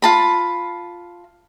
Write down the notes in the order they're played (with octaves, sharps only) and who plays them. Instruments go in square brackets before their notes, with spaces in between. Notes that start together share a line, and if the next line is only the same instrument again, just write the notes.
[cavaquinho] F4 A5 B5